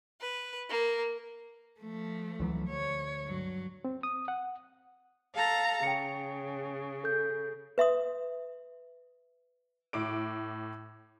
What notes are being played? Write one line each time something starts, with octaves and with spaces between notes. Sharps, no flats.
B4
A#3
F3 A3
C#2 E3 F#3
D2 C#5
G2 F#3
C4
D#6
F#5
A4 F5 A#5
C#3 G5 C#7
A4 G6
B4 E5 C6 D#6
A2 D6 D7